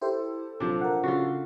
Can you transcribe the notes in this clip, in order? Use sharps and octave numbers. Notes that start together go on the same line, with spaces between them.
E4 G4 A4 C5
A#1 C3 F3 F#3 D4
A#4 F#5
C#3 F4 F#4